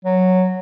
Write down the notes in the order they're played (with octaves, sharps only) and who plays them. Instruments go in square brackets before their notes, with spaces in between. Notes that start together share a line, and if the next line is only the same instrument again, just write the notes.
[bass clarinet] F#3